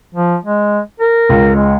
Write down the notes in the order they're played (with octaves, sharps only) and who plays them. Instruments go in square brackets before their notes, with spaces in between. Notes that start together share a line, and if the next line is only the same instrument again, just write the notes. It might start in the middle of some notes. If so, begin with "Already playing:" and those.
[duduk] F3
G#3
A#4
[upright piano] C#2
[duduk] G#3